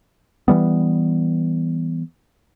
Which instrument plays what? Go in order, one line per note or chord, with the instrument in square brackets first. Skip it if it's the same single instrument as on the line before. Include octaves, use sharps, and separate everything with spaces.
[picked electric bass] E3 G3 B3